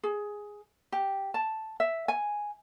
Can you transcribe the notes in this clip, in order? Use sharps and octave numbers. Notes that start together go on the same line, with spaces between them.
G#4
G4
A5
E5
G#5